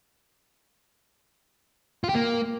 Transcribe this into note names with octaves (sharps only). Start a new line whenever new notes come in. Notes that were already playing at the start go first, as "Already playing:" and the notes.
F4
G4
A#3